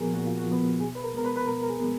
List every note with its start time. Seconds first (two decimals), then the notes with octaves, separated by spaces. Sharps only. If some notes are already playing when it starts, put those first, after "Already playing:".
Already playing: A#2 F3 B3 F#4 G#4 A#4
0.14 A#2 F#4
0.26 F4
0.38 F#4
0.47 F3 B3
0.80 B2 G#4
0.95 B4
1.03 A#4
1.14 G#3 B3 A#4
1.25 B4
1.36 B4
1.47 B2 A#4
1.63 A#4
1.69 G#4
1.80 G#3 B3